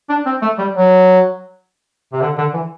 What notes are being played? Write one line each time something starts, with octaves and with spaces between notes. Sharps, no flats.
D4
C4
A3
G3
F#3
C3
D3
D3
E3